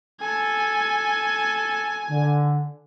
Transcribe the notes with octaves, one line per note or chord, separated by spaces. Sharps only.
A4 G#5
D3